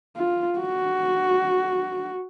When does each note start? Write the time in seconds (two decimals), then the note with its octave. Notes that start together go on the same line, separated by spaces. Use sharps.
0.16 F4
0.59 F#4